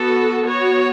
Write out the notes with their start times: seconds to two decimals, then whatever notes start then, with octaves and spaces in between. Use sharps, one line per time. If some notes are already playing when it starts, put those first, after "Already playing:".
Already playing: B3 F#4 A4
0.44 B3 F#4 C#5